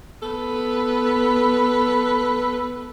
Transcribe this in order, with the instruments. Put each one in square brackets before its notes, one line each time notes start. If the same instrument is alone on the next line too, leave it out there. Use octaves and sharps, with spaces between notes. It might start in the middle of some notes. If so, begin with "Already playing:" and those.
[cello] B3 B4 [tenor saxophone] A4